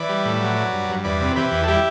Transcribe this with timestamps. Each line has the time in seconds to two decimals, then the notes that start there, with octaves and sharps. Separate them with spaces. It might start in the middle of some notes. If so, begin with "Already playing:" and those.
Already playing: E3 B4 D5
0.09 G3
0.25 A2
0.40 F#3
0.56 F#3
0.73 G2
0.89 G2
1.04 E2 B4 D5
1.21 C3
1.36 E3 G4 B4
1.52 E2
1.63 A4
1.67 G3 E4 G4